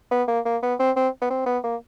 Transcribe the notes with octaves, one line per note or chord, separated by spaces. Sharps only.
B3
A#3
A#3
B3
C4
C4
B3
C4
B3
A#3